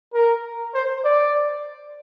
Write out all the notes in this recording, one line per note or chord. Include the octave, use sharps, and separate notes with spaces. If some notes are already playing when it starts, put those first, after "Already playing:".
A#4
C5
D5